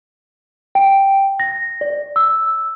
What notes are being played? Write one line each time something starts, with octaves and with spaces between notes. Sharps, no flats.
G5
A#6
D5
E6